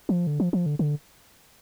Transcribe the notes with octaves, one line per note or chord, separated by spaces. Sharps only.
F3
D3
F3
F3
D3
D3